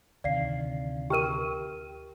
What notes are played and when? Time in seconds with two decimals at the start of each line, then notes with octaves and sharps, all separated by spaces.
0.24 D2 C3 D#3 D5 F5 C7
1.10 G4 A#4 G5 F6 D#7